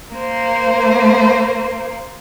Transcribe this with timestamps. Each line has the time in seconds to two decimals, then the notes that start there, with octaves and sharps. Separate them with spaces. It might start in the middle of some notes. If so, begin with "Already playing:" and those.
0.14 A#3 C5